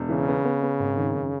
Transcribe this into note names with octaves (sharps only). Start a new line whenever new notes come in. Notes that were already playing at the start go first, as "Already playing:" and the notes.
Already playing: E1
C#3 E3
B3
B3
B3
G#1
D#3
F#2